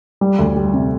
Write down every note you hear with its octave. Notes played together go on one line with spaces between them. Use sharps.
G3
D2
G3
C3